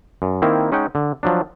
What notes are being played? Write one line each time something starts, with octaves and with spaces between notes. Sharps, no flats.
F#2
D#3 A#3 C4 E4
G#3 C#4 D#4 F#5 G5
D3
F3 F#3 D4